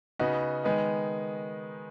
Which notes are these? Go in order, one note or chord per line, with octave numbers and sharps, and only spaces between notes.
C#3 B3 D#4 F#4
D#3 G#3 B3 D#4